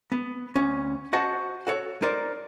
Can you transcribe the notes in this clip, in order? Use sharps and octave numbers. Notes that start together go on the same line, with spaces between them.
B3
D2 C#4
F#4 C5 D#5 F#5 A5
F#4 A4 C#5
D#4 A#4 C5 D5